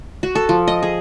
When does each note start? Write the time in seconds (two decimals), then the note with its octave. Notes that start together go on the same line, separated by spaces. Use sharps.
0.23 F#4
0.35 A4
0.49 F3
0.68 D#5
0.83 G#4